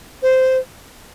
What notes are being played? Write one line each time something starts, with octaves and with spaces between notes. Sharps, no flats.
C5